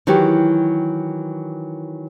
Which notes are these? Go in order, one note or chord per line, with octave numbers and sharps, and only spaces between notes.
D#3 E3 F#3 F#4 G4